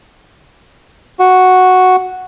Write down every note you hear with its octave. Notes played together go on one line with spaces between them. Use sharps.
F#4